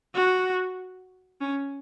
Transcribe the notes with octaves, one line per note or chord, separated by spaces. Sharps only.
F#4
C#4